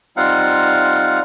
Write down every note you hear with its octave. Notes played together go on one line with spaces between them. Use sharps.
G3 C4 D#4 F4 F5 F#5